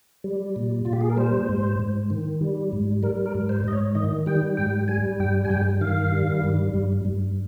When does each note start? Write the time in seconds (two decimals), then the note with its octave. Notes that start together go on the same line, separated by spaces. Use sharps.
0.24 G3
0.56 A#2
0.85 A#2 F4
0.93 G4
1.01 G#4
1.10 A#4
1.17 G3 C5
1.49 G#2
1.80 G#2
2.10 D#3
2.41 G3
2.73 G#2
3.03 G3 A#4
3.26 A#4
3.35 G#2
3.49 C5
3.64 G#2 D#5
3.73 C#5
3.95 D#3 D#5
4.26 G3 G5
4.57 G#2 G5
4.88 G3 G#5
5.20 G2 G5
5.45 G#5
5.50 G2 G5
5.81 D#3 F5
6.12 G3
6.44 G2
6.74 G2
7.05 G2